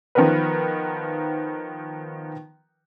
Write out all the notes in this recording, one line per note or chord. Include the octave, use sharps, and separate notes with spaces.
D#3 F3 B3 A#4 B4